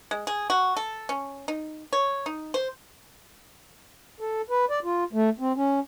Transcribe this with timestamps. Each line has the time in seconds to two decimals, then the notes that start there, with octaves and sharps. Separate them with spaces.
0.11 G#3
0.27 G#4
0.50 F#4
0.77 A4
1.09 C#4
1.48 D#4
1.93 C#5
2.26 D#4
2.54 C5
4.20 A4
4.50 B4
4.70 D5
4.84 F4
5.13 A3
5.40 C4
5.56 C#4